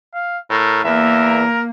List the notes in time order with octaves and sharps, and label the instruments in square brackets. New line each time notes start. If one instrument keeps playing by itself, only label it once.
[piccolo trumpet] F5
[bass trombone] A2 [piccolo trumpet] A#4
[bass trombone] E2 [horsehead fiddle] A#3 [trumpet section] A#4 [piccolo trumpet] E5